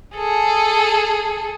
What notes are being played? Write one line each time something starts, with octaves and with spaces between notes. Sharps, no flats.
G#4 A4